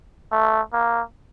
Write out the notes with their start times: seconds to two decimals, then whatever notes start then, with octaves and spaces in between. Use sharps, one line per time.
0.32 A3
0.73 A#3